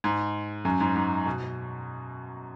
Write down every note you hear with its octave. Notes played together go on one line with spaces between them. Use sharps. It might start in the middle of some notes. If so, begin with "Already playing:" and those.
G#2
F#2
G#2
G#2
B2